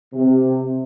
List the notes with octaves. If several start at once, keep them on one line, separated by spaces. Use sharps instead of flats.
C3